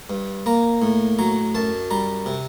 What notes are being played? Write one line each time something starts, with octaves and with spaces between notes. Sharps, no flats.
G2
A#3 A#5
A2
F#3 A#5
F#2 A5
G3 A#5
C3